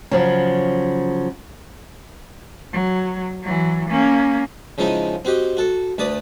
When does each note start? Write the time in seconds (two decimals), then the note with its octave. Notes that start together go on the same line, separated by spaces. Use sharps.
0.11 C#3 F3 F#3
2.72 F#3
3.43 E3 F#3
3.90 A#3 C#4
4.78 C#3 F3 G#3 D#4 E4
5.25 C4 F#4 G4 D#5
5.57 F#4 A4
5.98 D2 B4 D5 D#6